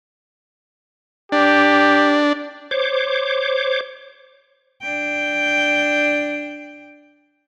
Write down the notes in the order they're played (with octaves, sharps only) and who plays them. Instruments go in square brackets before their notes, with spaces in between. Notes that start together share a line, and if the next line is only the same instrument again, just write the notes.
[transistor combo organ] D4 [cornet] G4
[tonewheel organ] C5 C#5 D6
[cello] D4 G5